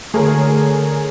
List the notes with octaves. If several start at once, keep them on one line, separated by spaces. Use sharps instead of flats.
D3 A3 G#4 A#4 C#5